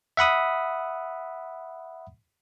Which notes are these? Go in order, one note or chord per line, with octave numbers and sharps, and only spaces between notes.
E5 F#5 B5 D#6